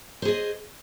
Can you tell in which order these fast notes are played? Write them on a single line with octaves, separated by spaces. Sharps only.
C5 G#4 D#5